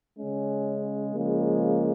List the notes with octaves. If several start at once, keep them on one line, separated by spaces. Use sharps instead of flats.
C#3 G#3 C#4
C#3 F3 G#3 A#3